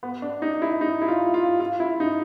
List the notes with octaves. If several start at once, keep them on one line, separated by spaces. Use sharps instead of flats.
B3
D4
D#4
E4
D#4
E4
F4
F4
F4
E4
D#4